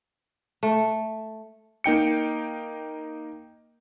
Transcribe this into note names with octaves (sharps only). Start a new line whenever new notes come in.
A3
A#3 D#4 G5 C#7